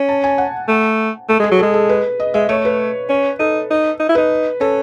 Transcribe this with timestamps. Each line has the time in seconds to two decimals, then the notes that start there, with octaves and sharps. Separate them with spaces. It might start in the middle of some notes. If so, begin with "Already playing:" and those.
Already playing: C#4
0.09 A5
0.24 G#5
0.38 F#5
0.68 A3
1.29 A3 A4
1.40 G#3 G#4
1.51 F#3
1.59 G#3 A4
1.74 A4
1.89 B4
2.20 D#5
2.34 G#3 E5
2.49 A3 C#5
2.65 B4
3.09 C#4
3.39 D#4 A4
3.71 D#4
4.00 D#4
4.09 E4
4.15 D#4 B4
4.61 C#4 A4